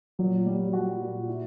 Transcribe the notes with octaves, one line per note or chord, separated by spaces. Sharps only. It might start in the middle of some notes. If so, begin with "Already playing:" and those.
A#2 F#3
G3
F#4
A#2
E4